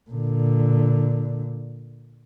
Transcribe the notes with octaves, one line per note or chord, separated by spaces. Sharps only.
A#2 D3